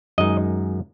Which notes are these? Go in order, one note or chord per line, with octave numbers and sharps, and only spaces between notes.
F#2 D#3 G#3 D#4 D#5